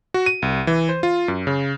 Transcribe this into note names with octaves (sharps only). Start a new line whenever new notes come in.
F#4
D#7
C2
E3
C5
F4
F#2
C#3